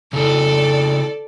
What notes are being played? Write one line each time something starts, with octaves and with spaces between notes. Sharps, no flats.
C#3 E4 A4 D5